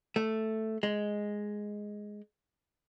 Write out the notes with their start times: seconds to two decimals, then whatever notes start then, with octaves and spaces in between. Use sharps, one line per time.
0.16 A3
0.83 G#3